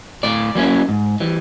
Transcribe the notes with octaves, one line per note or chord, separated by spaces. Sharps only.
A2 D5
F#3 A#3 C#4 E4
G#2
E3 G3